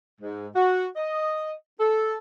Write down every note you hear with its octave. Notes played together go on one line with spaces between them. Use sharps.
G#2
F#4
D#5
A4